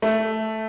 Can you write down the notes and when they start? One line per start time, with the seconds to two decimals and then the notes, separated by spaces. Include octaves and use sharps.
0.02 A3